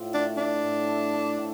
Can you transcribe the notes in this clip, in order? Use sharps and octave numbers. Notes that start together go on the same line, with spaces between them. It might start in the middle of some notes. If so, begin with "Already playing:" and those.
Already playing: A2 F4
A3 D4
A3 D4
A2
A3
A3
A2